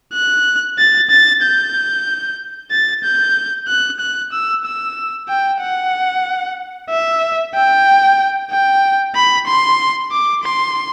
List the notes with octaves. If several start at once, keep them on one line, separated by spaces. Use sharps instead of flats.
F#6
A6
A6
G6
A6
G6
F#6
F#6
E6
E6
G5
F#5
E5
G5
G5
B5
C6
D6
C6